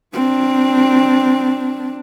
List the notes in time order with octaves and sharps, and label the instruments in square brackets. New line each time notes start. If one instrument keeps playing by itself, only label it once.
[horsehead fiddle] C4 D4